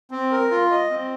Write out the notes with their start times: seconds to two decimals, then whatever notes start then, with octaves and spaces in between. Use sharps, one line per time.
0.11 C4
0.31 A#4
0.51 F4
0.71 D#5
0.90 C4